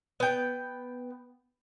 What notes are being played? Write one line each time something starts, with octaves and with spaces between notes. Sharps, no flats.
B3 G5